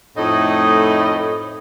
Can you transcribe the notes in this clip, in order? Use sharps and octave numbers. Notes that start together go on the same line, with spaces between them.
F2 A2 A3 D#4 D#5